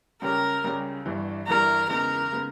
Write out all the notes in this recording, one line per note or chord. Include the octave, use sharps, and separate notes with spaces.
C#2 C#3 G3 C#4 G4 A#4
C#2 C#3 G3 C#4 G4
G1 G2 E3 G3
G1 G2 E3 G3 A#4
E2 C#3 G#3 B3 D#4 A#4
C#3 G#3 B3 D#4